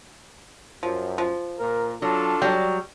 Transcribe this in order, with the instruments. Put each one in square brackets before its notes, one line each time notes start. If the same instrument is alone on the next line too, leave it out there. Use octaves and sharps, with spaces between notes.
[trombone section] F#2 [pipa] F3
[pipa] F3
[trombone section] A#2 A#4
[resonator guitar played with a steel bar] F#3 [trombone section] D4 F4 A4
[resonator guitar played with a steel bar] F#3 G3 [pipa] G5